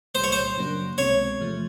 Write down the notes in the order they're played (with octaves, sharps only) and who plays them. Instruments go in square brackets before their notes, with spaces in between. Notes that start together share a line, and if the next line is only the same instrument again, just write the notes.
[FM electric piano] C2 A#2 G3 [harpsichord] C5
[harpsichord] C#5
C5
[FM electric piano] F#2 C#3 F#3 A#3 D4
[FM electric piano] C2 B2 G#3 C4 [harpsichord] C#5
[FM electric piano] E2 C3 F3 A3